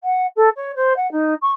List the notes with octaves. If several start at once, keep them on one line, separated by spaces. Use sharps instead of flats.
F#5
A4
C#5
C5
F#5
D#4
C#6